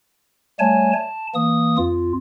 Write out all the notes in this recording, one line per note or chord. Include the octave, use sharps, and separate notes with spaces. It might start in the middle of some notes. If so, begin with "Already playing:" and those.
G3 A3 C#5 G#5 A5
A5
E3 A#3 D#6
F2 F4